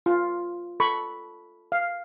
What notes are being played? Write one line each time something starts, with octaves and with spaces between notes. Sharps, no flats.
F4
A4 B5 C#6
F5